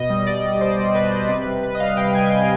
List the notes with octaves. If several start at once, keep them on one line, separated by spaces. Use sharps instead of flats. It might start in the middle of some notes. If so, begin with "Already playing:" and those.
Already playing: B2 D#5
G3
B2 D5
G3
B2 C5
G3
B2 B4
G3 C5
C3 B4
G3
C3 B4
D#5
G3 F5
C3 G5
G3 G#5
C3 G5